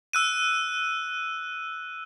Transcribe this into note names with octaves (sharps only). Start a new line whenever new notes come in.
E6 F#6 D#7